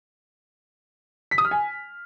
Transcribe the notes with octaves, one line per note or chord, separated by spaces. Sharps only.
B6
D#6
F6
G#5